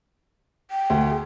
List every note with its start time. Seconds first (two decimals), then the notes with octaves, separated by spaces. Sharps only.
0.71 G5
0.90 D2
1.10 G#4